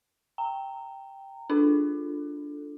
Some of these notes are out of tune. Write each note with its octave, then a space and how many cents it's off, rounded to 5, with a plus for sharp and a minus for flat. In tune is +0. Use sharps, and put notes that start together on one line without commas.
G5 +0 A#5 -20
D4 +0 F4 +0 A4 +0